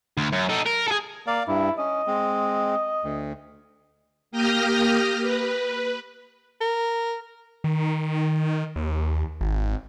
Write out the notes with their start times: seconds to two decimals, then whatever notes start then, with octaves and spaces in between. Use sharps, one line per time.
0.18 D2
0.32 F#2
0.49 D#4 A4
0.66 A#4
0.87 G#4 A4
1.27 A#3 D5 F5
1.48 G2 E4
1.78 C#4 D#5
2.07 G#3 C4
3.04 D2
4.31 A#3 G4 D#6 F6 G6 A#6
5.21 B4
6.61 A#4
7.64 D#3
8.76 D#2
9.41 G#1